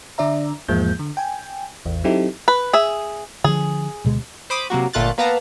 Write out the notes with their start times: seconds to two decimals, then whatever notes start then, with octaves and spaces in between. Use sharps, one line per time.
0.18 D3 D4 D5 E5 A#5
0.68 E2 G#2 F3 G#3 A#3 G6
0.99 D3
1.17 G5 G#5
1.85 A1 E2
2.04 F#3 C4 D#4 E4 G4 A4
2.48 B4
2.73 G#4 E5
3.44 D3 F3 G#4
4.05 D2 B2 G#3
4.50 C5 B5 D6 D#6
4.70 C3 F#3 A#3 F#4
4.93 G1 A#2 A3 F4 F#6 A6
5.18 A#3 B3 B4 F5 A5 A#5